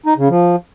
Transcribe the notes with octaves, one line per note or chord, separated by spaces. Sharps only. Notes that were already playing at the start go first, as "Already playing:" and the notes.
D#4
C#3
F3